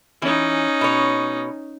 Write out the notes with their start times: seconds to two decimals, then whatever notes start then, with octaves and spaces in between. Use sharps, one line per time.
0.22 E3 C#4 D#4
0.81 B2 C#5